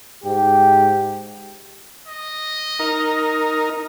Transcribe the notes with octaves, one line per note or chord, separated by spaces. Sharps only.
G#2 G4
D#5
D#4 A#4